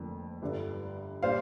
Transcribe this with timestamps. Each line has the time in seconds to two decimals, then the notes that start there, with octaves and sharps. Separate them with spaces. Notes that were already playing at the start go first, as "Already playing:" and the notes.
Already playing: F1 F2 D3 A#3
0.42 G1 G2 D3
1.23 A#2 G3 D4 F4 C5 F5